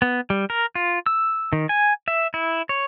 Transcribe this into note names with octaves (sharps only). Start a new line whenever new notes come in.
B3
G3
A#4
F4
E6
D#3
G#5
E5
E4
C#5